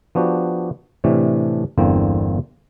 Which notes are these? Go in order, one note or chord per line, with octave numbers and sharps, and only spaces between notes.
F3 B3 D4 F#4 G4
A2 C3 E3 A3 D4
G1 E2 D3 A#3 C4